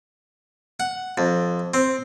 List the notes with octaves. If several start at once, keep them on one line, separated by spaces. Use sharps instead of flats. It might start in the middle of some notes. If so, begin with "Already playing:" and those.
F#5
F2
C4